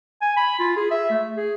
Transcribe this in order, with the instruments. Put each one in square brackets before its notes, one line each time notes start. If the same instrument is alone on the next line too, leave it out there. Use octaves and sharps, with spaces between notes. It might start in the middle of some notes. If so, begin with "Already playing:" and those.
[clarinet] G#5
B5
F4
G#4
E5
A3
G#4